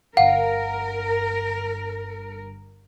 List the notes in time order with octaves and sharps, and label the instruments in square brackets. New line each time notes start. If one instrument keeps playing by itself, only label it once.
[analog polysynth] G1 G2 [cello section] A#4 [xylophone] F5 [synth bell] F#5